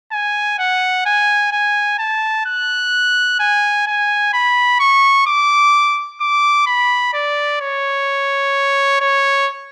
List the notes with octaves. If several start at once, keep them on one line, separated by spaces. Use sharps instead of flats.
G#5
F#5
G#5
G#5
A5
F#6
G#5
G#5
B5
C#6
D6
D6
B5
D5
C#5
C#5